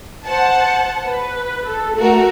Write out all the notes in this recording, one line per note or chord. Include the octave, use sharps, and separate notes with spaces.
C5 F#5 A5
B4
A4
A3 F#4 A#4